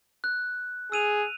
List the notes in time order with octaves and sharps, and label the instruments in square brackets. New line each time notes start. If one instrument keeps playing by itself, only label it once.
[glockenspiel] F#6
[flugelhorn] G#4 [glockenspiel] E6 D#7 F7